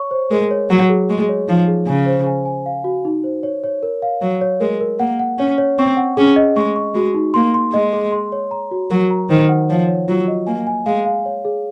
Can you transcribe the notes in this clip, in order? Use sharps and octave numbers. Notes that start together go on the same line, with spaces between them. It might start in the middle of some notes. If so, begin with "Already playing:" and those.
Already playing: C#5 C#6
C5
G#3 A#4
C#5
F#3 F#5
G#4
G#3 C#6
C#5
F3 D#4
G#4
C#3 G#5
C5
G#5
G#5
F5
F#4
D#4
C5
C#5
C#5
A#4
F5
F#3 C#5
C#5
G#3 A#4
A#4
A#3 F#5
F#5
C#4 C#5
C#5
C4 C#6
F#5
C#4 G#4
D#5
G#3 C#6
C#6
G#3 F#4
D#4
A#3 C6
C6
G#3 D#5
G#4
C6
C#5
A#5
F#4
F#3 A#4
A#5
D#3 C5
F#5
F3 C#5
C#5
F#3 F4
D#5
A#3 G#5
G#5
G#3 F5
F5
C#5
G#4